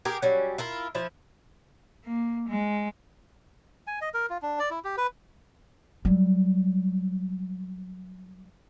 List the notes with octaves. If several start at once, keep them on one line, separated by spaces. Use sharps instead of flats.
G4 G#4 A#4
F#3 G3 C#4
E4 F4 A#4
F3 E4
A#3
G#3
G#5
D#5
A#4
F4
D4
D5
E4
G4
B4
F#3 G3